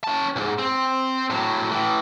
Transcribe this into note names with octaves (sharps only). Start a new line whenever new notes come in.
C#4 A5
B1 G#2
C4
A2 F#3
A2 E3